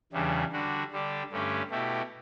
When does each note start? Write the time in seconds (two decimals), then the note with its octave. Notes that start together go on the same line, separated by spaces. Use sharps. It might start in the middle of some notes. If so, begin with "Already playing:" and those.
0.12 E2 C#3 E3 G3 D4
0.52 D3 G3 D4 F#4
0.91 D3 G3 D4 G4
1.30 G2 D3 A3 C#4 G4
1.70 B2 A3 E4 G4